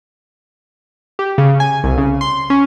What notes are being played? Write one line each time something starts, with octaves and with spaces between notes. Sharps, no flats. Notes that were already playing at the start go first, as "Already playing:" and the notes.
G4
C#3
G#5
C2
C#3
C6
C#4